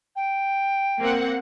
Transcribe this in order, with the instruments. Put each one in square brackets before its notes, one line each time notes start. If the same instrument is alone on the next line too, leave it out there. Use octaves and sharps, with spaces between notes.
[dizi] G5
[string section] A#3 C4 F#5